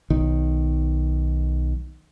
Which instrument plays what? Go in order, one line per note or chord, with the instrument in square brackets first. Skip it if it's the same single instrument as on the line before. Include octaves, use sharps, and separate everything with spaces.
[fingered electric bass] B1 D#3